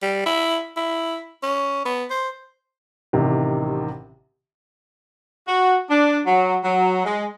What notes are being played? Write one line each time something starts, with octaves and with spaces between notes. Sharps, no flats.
G3
E4
E4
C#4
B3
C5
A1 C3 D#3 G4
F#4
D4
F#3
F#3
G#3